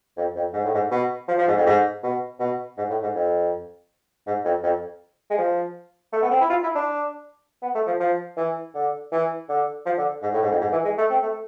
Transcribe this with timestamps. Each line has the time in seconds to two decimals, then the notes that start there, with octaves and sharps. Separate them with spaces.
0.17 F2
0.36 F2
0.53 G#2
0.65 A2
0.74 G#2
0.91 B2
1.28 F3
1.38 F3
1.47 G#2
1.57 F2
1.66 G#2
2.03 B2
2.40 B2
2.77 G#2
2.90 A2
3.02 G#2
3.15 F2
4.27 G#2
4.45 F2
4.63 F2
5.30 G#3
5.38 F3
6.13 A3
6.22 B3
6.31 C4
6.41 E4
6.50 F4
6.63 E4
6.75 D4
7.62 B3
7.75 A3
7.87 F3
8.00 F3
8.37 E3
8.74 D3
9.12 E3
9.49 D3
9.86 F3
9.98 D3
10.22 G#2
10.33 A2
10.42 G#2
10.51 F2
10.61 G#2
10.72 E3
10.85 G#3
10.98 A3
11.10 C4
11.22 A3